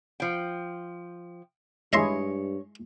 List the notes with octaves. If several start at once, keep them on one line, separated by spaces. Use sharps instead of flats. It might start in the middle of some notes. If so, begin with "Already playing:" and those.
F3 G5
G2 G#3 E4 G#4 C#5 D#5 E5 C6